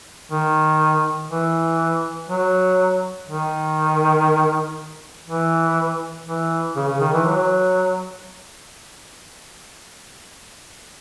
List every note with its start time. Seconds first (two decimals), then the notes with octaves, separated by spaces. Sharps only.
0.31 D#3
1.30 E3
2.29 F#3
3.28 D#3
5.27 E3
6.26 E3
6.76 C#3
6.88 C#3
7.00 D#3
7.13 E3
7.25 F#3